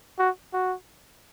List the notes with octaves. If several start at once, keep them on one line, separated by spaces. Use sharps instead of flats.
F#4
F#4